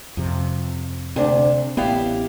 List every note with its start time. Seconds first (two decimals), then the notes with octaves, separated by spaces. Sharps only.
0.17 F2 C3
1.16 D2 C3 D4
1.77 A1 B3 E4 G4 F5